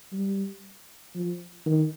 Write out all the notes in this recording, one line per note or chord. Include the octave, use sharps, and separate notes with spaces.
G3
F3
D#3